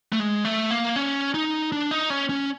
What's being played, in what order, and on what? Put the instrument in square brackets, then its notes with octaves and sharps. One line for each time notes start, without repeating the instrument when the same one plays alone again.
[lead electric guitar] A3
G#3
A3
A#3
C#4
D#4
D4
D#4
C#4
C#4